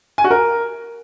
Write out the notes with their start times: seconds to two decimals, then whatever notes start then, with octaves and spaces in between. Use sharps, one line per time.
0.18 G#5
0.24 F#4
0.31 A#4